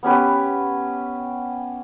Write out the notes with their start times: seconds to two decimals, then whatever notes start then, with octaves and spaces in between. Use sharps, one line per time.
0.03 B3 C#4 G4 B4